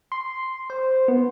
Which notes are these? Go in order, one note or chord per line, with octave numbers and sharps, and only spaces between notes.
C6
C5
B3